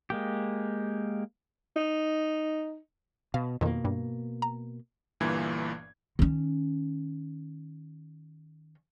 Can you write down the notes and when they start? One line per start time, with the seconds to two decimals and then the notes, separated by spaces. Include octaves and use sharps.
0.10 G#3 A#3 G4
1.76 D#4
3.34 B2 F5
3.61 F2 B2 D#3 A#3
3.85 G2
4.42 A#5
5.20 G1 G2 A#2 E3 A#3 G#6
6.19 D#3 C#4